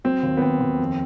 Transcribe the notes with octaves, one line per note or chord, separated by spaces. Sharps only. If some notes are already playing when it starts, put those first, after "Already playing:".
F#3 C4
D#2
B3
D#2 C4
D#2
F2